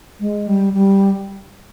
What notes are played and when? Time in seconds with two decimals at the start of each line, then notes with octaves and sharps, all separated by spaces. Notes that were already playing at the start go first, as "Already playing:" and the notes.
0.20 G#3
0.47 G3
0.74 G3